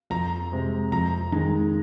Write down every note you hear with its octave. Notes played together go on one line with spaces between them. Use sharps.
F2 A#5
C3 G#3
F2 A#5
D#3 G#3 A#5